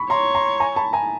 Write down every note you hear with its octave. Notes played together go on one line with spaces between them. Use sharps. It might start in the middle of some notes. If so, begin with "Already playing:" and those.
Already playing: B5 C#6
C#5 A#5 C6
A#5 C6
G#5 A#5
A5 B5
G#5 A#5